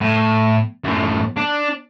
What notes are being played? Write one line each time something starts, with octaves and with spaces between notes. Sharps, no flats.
A2
F#2 A2
D4